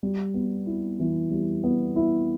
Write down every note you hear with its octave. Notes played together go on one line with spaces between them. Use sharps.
G3
B3
E4
E3
G3
B3
E4